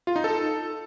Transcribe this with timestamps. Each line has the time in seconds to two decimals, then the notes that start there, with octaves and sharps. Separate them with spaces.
0.07 F4
0.16 D#4
0.24 A4